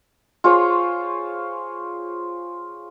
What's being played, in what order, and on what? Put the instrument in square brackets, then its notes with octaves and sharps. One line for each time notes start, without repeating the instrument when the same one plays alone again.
[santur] F4 G#4 C5 C#5